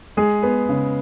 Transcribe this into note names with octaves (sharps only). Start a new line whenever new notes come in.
G#3 G#4
B3
C#3